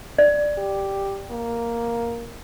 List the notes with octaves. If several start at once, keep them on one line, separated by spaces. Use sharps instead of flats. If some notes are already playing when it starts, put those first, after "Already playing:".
D5
G4
A#3